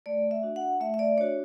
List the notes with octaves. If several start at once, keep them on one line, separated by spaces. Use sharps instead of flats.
A3 D5
E5
D4 F#4
F#5
A3 E5
E5
D5
D4 F#4 C#5